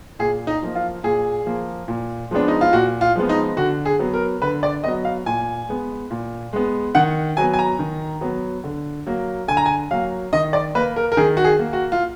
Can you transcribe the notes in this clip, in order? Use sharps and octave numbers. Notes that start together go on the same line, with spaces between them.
A#2 G#4
D#4
F3 A#3
F4
A#2 G#4
F3 A#3
A#2
F3 G#3 B3 D4
D#4
F4
A#2 F#4
F4
F3 G#3 B3
D#4
D3 F#4
G#4
F#3 B3
A#4
D3 B4
D5
F#3 B3 D#5
F5
A#2 G#5
G#3 B3
A#2
G#3 B3
D#3 F#5
F#3 B3 G#5
G#5
A#5
D#3
F#3 B3
D3
F#3 A#3
D3 G#5
A#5
G#5
F#3 A#3 F5
D#3 D#5
D5
A#3 B4
A#4
A#4
D#3 G#4
F#4
G#4
A#3
F#4
F4